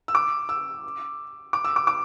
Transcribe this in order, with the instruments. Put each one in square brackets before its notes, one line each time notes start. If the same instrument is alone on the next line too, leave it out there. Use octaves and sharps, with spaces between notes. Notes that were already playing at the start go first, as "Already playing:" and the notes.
[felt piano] E6
D6
E6
D6
E6
D6
D6